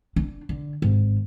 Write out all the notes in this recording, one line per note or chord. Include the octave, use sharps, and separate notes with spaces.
D4
D3
G#1